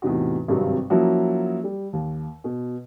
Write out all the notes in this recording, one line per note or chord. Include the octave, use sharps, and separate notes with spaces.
E2 A2 C3 D#4 F#4
G#1 G2 C3 F#3
F3 F#3 A#3 C#4 E4 F#4
G3
D#2
B2